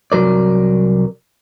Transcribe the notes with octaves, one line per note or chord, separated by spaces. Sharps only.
C2 G2 F#3 A#4 D5